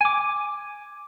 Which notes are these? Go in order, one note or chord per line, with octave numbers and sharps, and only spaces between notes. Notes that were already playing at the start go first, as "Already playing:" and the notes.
G#5 D6